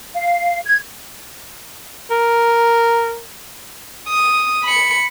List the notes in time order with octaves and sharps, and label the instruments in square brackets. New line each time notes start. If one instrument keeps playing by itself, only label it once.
[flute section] F5
G#6
[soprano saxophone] A#4
[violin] D#6
B5 C#7